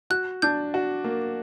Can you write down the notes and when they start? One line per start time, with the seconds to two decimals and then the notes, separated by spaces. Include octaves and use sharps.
0.10 F#4 F#6
0.42 D4 G6
0.74 F#4
1.04 A#3